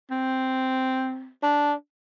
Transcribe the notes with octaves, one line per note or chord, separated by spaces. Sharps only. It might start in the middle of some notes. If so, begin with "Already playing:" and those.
C4
D4